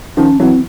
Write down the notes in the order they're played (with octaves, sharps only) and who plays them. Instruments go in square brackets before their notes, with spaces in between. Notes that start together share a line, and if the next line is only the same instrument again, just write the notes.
[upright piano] D#3 F3 [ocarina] C#4
[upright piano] E3 F#3 [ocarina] C4